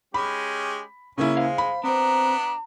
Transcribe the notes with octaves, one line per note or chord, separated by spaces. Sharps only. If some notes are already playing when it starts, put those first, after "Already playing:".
G#3 C#4 G4 B5
C#3 A#3 C#4 E4
G#3 C5 F5
B5
B3 C4 D4 C5 A#5